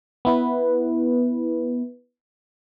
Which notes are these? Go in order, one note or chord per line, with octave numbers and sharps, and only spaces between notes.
B3 E4 B4